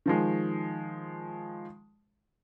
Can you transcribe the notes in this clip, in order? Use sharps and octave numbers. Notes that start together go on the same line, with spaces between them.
D#3 F3 G#3